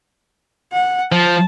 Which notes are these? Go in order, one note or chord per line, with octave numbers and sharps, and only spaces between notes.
F#5
F3 A5